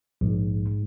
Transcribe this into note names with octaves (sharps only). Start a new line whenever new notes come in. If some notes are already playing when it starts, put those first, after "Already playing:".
A#1 G#2